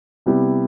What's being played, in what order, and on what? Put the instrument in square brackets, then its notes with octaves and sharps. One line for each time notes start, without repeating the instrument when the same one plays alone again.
[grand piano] C3 G3 B3 E4 G4